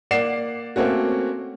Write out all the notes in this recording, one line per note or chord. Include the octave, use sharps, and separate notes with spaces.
A#3 D5 F#5 C7 E7
A3 A#3 C4 C#4 F#4